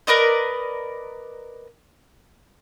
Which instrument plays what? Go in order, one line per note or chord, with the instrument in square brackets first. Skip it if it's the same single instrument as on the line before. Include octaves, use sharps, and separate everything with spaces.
[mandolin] A#4 B4 D5 D#5